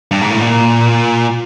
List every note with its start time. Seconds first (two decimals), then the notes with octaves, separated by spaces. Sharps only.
0.11 G2
0.21 G#2
0.30 A2
0.41 A#2